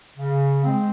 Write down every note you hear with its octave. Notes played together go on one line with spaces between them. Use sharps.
C#3
G#3 C4